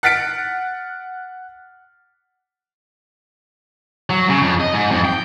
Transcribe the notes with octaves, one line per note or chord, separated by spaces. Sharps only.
F#5 F6 A6 B6 C#7 D7
F#3
C#3
F2
D#5
G#2
F2
G5